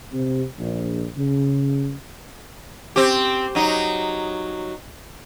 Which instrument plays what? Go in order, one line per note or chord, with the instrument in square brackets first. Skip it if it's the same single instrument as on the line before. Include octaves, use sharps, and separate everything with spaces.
[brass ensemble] C3
A#1
C#3
[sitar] C4 G4
F#3 D#4